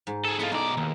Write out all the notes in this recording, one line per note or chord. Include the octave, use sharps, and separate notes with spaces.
G#2
G#4 A4
B3 E4 F4 A4 D#5
B1 G#3 D#4 D5
D#2 B2